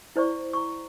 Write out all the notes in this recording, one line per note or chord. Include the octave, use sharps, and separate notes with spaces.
E4 C5 D5 C#6
A#5 C#6